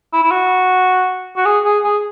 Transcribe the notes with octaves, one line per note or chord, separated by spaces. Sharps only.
E4
E4
F#4
F#4
G#4
G#4
G#4